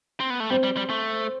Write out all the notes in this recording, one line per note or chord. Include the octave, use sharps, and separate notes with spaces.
C4
B3
A3
G3 C4
G3
G3
A3